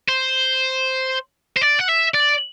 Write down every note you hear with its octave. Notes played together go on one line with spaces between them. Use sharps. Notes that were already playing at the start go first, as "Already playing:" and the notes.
C5
C5
D5
F#5
E5
D5